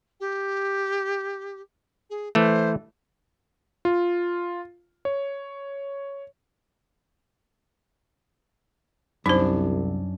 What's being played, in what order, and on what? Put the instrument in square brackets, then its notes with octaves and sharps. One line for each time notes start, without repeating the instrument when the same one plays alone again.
[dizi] G4
G#4
[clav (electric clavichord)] E3 A3 [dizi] C5
[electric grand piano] F4
C#5
[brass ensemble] C2 [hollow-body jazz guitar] F#2 D4 [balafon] D#4 C5